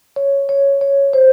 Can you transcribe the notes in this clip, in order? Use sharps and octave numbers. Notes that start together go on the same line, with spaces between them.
C#5
C#5
C#5
C5